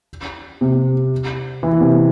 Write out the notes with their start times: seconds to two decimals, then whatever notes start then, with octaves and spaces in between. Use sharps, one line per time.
0.61 C3
1.63 E3
1.80 C3